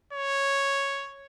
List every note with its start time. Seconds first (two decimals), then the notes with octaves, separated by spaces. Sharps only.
0.13 C#5